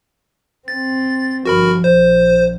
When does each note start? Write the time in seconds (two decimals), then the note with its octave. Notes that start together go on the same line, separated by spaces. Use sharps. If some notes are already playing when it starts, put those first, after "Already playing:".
0.68 C4 A6
1.45 G1 F3 F#4 A#4 B5
1.84 A#1 C5